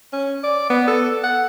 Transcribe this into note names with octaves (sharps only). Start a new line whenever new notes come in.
C#4
D5
B3
A4
F#5